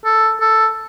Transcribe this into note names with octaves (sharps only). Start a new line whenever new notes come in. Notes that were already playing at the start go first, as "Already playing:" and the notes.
A4
A4